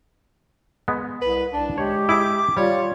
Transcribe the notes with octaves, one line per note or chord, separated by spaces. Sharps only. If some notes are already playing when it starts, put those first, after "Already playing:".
G#3 B3
C2 B4
C2 D4 A5
G#3 G4 C#5
E4 G#4 D6
G3 F4 C#5 D5